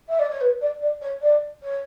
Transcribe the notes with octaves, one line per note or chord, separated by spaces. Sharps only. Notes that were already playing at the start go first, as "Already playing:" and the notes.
E5
D5
C#5
B4
D5
D5
C#5
D5
C#5